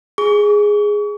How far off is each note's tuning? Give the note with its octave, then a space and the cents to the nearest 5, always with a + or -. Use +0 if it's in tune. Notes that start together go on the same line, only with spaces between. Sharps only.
G#4 +0 C#6 +40